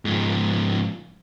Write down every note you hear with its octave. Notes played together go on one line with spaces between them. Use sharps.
G#2 F3